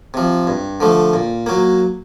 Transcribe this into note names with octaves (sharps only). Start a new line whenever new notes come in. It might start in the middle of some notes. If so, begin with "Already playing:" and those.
C3 F3
G2
D3 F3 A3
A#2
F#3 A#3